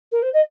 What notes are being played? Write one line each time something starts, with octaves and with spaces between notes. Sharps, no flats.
A#4
C5
D#5